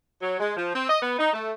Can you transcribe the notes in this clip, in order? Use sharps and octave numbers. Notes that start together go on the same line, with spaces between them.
F#3
G#3
F3
C4
D#5
B3
D#4
A3